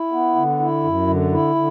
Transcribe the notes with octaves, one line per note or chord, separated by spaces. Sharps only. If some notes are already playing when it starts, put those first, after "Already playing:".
Already playing: E4
B3
D3
E4
F#2
D3
E4
D3